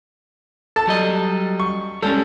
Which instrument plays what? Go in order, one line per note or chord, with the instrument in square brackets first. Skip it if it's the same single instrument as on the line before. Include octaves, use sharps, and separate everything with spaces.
[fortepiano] A4 A5
[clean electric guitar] F#3 G3 D#5
[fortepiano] C#6
[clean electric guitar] G3 G#3 C#4 [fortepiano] A4